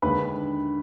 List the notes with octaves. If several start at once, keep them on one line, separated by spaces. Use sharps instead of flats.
D#2 D3 G#3 B4 B5